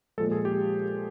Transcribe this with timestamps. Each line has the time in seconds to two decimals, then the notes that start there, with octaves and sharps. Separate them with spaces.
0.18 A#2 F3 G#3 A4
0.32 G#4
0.45 G4